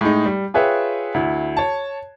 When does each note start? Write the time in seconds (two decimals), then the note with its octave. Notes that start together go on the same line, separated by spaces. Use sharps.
0.01 A2 G#3 D#4
0.26 G3
0.54 F4 G#4 B4 C#5 E5 G5
1.14 D2 E4
1.57 C#5 A5